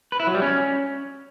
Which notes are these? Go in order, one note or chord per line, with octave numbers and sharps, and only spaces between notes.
B4
E4
F#3
G3
C#4